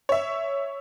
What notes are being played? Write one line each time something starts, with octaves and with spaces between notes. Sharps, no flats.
C#5 E5